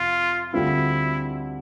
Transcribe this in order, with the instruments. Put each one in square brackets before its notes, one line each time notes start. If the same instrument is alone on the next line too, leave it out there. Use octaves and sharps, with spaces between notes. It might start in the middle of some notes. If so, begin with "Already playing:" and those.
Already playing: [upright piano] F2 C3 [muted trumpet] F4
[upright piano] D2 D3 G3 C4 F4 [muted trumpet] E4